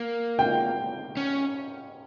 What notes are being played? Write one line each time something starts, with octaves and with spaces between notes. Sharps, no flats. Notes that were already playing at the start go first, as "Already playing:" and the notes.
Already playing: A#3
G5
C#4